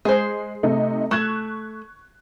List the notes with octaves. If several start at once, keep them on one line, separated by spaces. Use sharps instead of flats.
G#3 G#4 C5
C3 A3 D#4
A3 C#6 F#6 G#6